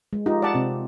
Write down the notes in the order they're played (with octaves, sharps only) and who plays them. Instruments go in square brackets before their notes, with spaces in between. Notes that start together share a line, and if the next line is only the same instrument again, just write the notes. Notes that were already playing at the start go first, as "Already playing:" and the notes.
[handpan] G#3
[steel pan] D#4 [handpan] F4 G4
[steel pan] D5 F#5 A5
[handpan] C3 C4